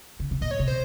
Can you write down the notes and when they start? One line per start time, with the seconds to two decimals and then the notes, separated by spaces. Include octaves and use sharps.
0.20 C#3
0.31 C3
0.41 A#2 D#5
0.51 C#5
0.59 C3
0.68 C5